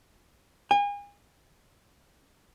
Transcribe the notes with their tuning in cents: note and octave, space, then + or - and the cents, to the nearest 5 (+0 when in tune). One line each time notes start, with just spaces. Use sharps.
G#5 -35